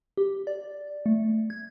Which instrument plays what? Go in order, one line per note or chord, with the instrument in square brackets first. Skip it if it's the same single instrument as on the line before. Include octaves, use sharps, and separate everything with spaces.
[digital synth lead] G4
D5
A3
G#6